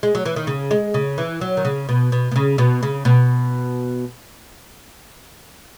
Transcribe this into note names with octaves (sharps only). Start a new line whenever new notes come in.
G#3
F#3
E3
D#3
C#3
G#3
C#3
E3
F#3
D#3
C#3
B2
B2
B2
C#3
B2
C#3
B2